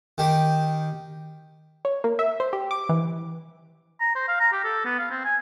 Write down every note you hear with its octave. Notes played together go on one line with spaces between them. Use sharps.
D#3 G4
C#5
A#3
E5
C5
G4
D6
E3
A#5
C5
F5
A#5
G4
A4
B3
F5
C4
G#5